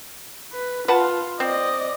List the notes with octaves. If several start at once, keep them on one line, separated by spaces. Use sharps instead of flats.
B4
F4 B4 F#5 A5
C4 D5 D#5